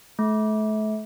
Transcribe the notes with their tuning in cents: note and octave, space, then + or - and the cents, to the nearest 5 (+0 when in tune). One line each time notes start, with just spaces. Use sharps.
A3 -35